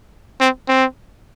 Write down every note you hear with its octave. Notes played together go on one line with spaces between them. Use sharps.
C4
C4